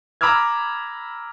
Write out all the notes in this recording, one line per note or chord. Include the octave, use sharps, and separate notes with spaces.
A#5 B5 D6 E6 F6 G#6